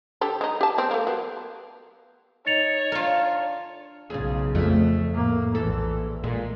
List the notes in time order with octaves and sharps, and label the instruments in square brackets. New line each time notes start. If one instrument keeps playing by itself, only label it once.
[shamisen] D3 G4 A4
G#3 D#4
G4 A5
B3 C4 G4
A3 A#3
F#3 B3
[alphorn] D#4 [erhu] C#5 [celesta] A6 C#7 F7
[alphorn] D4 [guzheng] F4 A#4
[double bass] B1 C#3 [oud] F4 G#4
[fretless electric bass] F2 [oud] A3 D4
[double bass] A2 A#3
[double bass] A#1 E3 [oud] A4
[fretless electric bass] A#2 [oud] G#3